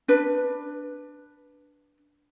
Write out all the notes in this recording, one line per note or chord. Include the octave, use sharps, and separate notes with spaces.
D4 B4